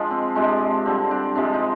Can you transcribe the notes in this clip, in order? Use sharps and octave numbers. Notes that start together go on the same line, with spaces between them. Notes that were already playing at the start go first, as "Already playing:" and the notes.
Already playing: F3 G#3 D4
C4
C3 F3 G#3 D4
D3 G3 C4
D4
C3 F3 G#3 D4
D#4